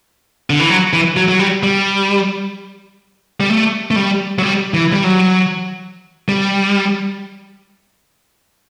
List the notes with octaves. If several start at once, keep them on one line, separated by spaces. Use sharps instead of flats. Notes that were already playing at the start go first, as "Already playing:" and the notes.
D3
E3
F#3
E3
F#3
F#3
G3
G3
G3
A3
A3
G3
F#3
G3
E3
G3
F#3
G3